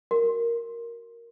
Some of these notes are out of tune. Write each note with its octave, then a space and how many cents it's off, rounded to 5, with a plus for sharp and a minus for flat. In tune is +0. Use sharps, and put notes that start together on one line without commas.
F#4 +5 A#4 +0